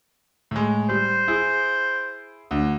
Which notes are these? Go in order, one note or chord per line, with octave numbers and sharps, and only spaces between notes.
A2 G#3
G3 C5
E4 G#4
D2